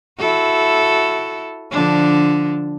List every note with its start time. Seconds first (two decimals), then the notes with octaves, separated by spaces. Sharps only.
0.19 E4 F#4 A4
1.72 D3 F3 D4